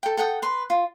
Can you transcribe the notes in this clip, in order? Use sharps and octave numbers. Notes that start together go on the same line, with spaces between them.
A4 G5
A4 F#5 G5 D#6
B4 C6
F4